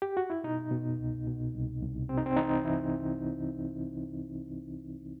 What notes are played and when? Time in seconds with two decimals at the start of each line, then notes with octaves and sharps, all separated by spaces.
0.02 G4
0.17 F#4
0.30 E4
0.44 B2 D#4
0.71 B2
1.00 C2
1.27 B2
1.54 C2
1.82 C2
2.09 C3 C4
2.18 D#4
2.26 C4
2.36 E3 D#4
2.64 E3 E4